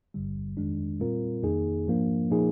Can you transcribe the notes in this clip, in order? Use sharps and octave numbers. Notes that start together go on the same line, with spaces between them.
G#1 G2 D3 G3
F2 D#3 G#3 D4
A#2 G3 C4 F4 A#4
F2 D#3 A#3 D#4 G#4
G#2 F3 A#3 D4
A#2 F3 A#3 D#4 G#4